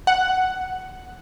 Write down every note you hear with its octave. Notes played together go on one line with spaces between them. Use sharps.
F#5